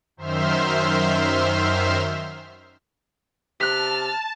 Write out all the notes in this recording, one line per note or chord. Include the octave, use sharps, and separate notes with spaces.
F#2 D#3 C5 E5 C6 F6
C3 A5 F6 F#6 B6